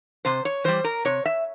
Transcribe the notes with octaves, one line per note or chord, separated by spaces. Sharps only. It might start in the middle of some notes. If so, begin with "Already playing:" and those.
C3 C5
C#5
E3 G3 C5
A#4
C3 C#5
E5